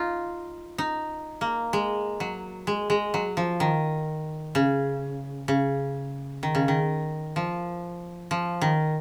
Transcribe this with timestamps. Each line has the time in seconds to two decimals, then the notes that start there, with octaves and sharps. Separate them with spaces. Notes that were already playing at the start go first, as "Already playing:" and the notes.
Already playing: D#4 F4
0.78 D#4
1.41 A#3
1.73 G#3
2.20 F#3
2.67 G#3
2.90 G#3
3.14 F#3
3.37 F3
3.60 D#3
4.55 C#3
5.48 C#3
6.43 D#3
6.55 C#3
6.68 D#3
7.36 F3
8.31 F3
8.61 D#3